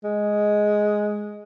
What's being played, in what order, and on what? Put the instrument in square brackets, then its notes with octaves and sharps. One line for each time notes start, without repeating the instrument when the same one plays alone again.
[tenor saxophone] G#3